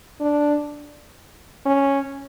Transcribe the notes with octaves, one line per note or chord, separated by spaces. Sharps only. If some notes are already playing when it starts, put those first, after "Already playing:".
D4
C#4